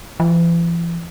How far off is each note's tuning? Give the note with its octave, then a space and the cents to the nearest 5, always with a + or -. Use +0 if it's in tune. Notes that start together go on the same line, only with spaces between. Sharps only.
E3 +45